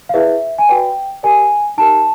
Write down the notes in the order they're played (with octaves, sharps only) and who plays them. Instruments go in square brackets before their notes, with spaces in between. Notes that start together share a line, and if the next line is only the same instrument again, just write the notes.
[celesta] F5
E4 G#4 B4 D5 E5
G#5
F#4 B4 D5 G5
G4 A#4 D5 G#5
D#4 G4 A#4 A5